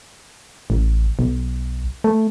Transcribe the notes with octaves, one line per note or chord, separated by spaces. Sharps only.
A1
B1
A3